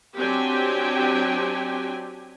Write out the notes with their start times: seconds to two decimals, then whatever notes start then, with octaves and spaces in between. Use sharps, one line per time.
0.17 F#3 C4 D4 G4 G5 G#5